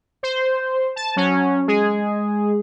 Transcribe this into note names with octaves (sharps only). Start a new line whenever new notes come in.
C5
A5
F#3 C#4
G#3 G#4